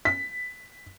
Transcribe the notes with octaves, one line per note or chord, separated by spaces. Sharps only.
B6